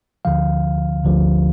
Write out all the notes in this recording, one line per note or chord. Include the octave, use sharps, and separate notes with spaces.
D2 D3 F3 F5
D2 D3 F3